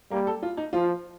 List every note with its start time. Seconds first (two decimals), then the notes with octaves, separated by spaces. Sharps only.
0.11 G3 A#3
0.27 A4
0.43 F4
0.57 D#4
0.73 F3 F4